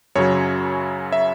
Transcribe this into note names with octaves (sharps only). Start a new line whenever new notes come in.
F#2 C#3 F#3 C#5
E5